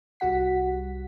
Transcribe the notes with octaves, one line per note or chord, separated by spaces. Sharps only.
C2 G3 F#4 F#5 B6